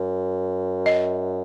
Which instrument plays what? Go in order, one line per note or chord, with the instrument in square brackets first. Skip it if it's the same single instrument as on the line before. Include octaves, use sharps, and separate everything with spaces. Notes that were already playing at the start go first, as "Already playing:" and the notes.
Already playing: [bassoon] F#2
[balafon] D#5